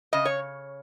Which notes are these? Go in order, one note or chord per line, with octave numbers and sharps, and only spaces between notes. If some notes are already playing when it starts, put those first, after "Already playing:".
C#3 D#5
C#5